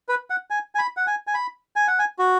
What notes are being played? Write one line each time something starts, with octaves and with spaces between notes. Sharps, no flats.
B4
F#5
G#5
G#5
B5
F#5
G#5
G#5
B5
G#5
F#5
G#5
F#4